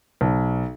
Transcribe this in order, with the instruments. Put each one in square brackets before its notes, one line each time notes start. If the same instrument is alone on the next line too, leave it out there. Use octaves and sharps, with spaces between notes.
[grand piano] B1